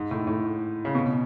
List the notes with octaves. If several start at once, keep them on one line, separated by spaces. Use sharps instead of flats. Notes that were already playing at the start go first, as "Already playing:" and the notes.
Already playing: G#2
A2
A2
C#3
B2